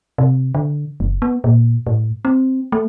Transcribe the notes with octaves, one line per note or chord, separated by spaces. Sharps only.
C3
D3
F#1
B3
A#2
A2
C4
A3